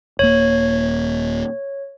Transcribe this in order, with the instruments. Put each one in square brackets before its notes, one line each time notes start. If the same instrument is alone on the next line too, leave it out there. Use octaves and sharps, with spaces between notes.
[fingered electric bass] D#1 A#3 [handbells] C#5